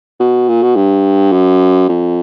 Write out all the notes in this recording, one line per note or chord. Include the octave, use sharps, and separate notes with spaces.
B2
A#2
B2
G2
F#2
F2